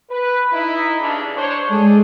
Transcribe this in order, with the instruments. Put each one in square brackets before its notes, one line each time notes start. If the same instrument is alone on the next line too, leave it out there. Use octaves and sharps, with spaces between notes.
[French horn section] B4
D#4 E4
G2 C#3 D4
D4 C5 C#5
[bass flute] G#3 [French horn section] D4 G#4 A4